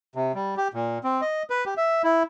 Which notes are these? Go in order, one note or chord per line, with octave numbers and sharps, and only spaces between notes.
C3
G3
G4
A#2
C4
D#5
B4
G4
E5
E4